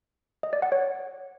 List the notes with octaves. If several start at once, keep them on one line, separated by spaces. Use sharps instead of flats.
D#5
D5
F#5
C#5